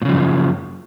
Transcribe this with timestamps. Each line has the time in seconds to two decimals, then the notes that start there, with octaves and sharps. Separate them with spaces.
0.02 A2
0.05 C#3
0.09 F3
0.12 F#2